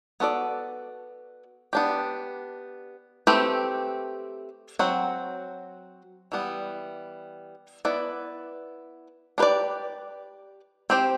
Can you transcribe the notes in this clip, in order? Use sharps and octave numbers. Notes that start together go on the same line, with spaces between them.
B3 F#4 A4 D5
B3 D4 G4
A3 C4 G4 B4
F#3 C4 F#4
E3 G3 B3
B3 E4 B4 D5
D4 G4 B4 D5
C4 G4 C5